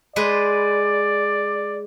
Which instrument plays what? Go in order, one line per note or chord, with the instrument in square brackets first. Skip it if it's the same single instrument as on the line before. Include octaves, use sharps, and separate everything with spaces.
[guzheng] G#3 B4 C5 [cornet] D5